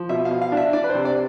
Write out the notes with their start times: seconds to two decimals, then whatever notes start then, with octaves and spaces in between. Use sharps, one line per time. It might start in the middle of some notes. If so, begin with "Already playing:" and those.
Already playing: F3
0.09 B2 E5
0.25 F5
0.31 B2
0.42 F5
0.52 D4
0.57 E5
0.73 D4 D5
0.84 B4
0.90 C5
0.94 C3
1.05 D5